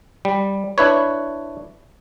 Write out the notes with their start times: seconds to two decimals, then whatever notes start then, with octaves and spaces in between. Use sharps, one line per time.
0.25 G3
0.78 D4 E4 B4 C#5